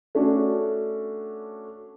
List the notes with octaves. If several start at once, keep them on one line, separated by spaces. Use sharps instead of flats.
A3 C#4 D4 F#4